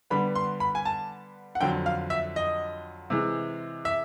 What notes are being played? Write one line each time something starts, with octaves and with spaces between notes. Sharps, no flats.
D3 G3 B3 B5
C6
B5
G#5
A5
F#5
F2 D3 F#3 G5
F5
E5
D#5
C3 E3 G#3
E5